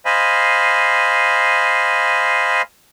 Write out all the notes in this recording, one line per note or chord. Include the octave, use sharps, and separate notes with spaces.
C5 D#5 F5 G#5 B5